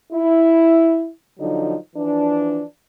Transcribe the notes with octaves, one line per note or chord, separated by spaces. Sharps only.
E4
D3 F3 F#3 D#4
E3 F3 D4